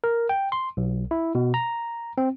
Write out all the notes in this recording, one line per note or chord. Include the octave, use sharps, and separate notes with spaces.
A#4
G5
C6
B1
E4
B2
A#5
C4